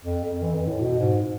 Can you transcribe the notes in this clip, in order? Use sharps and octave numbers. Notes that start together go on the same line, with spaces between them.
F2
F2
E3
F2
A2
B2
G#2